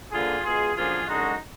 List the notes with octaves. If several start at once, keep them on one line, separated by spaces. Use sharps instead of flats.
D3 F3 A#3 F4 G#4
B2 G#3 F4 G#4
F#2 D3 F3 A#3 F4 G#4
F#2 D3 G#3 D#4 F#4